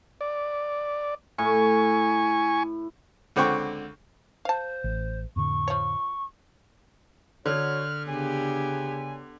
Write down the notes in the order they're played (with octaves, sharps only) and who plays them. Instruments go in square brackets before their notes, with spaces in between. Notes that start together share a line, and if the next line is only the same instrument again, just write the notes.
[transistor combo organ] D5
[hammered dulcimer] A2 [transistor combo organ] G#5 C#6
[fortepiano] C#2 D3 C4 F#5 G5 C#6
[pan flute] C5 [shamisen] F5 A5
[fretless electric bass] A1
[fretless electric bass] F2 A2 D3 [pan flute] C#6
[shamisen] F3 C#5
[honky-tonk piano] D3 [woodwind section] F#4 C#5 [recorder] F6
[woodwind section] C#3 [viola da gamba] B3 D4 G4 [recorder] G#5